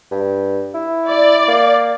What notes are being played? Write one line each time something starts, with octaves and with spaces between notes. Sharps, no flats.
G2
E4
D5
A#3